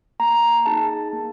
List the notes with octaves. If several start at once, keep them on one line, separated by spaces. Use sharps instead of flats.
A#3 A#5
D#4 G#4 A5
A#3